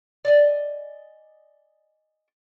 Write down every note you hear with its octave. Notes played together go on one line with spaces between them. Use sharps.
D5 D#5 G#5